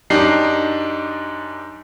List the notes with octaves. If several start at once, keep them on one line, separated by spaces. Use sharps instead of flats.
F#2 D4 D#4 G4 C7